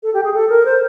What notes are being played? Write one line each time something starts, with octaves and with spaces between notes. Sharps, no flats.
A4
G4
G#4
A4
A#4
C5